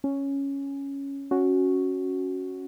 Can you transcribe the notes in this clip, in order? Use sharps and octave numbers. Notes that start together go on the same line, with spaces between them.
C#4
C#4 F#4